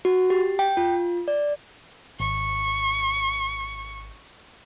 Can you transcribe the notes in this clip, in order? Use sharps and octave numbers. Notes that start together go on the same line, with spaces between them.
F#4
G4
G5
F4
D5
G#1 C#6